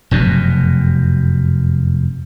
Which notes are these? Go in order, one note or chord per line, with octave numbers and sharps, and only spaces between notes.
F1 F#2 B2